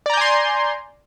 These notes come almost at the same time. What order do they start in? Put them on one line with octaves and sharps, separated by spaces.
D5 A#5 G6 G#5 C6